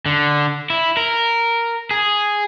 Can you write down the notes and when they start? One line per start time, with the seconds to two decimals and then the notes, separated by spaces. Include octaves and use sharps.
0.06 D3
0.70 E4
0.97 A#4
1.91 G#4